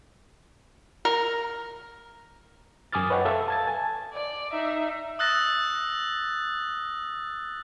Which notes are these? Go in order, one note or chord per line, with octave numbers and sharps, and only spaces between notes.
A#4
F#2 G#5 D6 D#6 F6 A6
B4 C#5 D#5 F#5 G5
A4 E5 F5
A5 G#6 A6
G#5
D5
D#4 E5
D#6 E6 F#6 A6 A#6